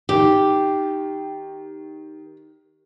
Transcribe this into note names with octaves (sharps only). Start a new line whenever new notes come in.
D#3 G4